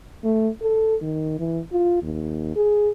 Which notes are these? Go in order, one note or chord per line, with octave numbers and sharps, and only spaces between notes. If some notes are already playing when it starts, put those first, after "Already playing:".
A3
A4
D#3
E3
F4
D#2
G#4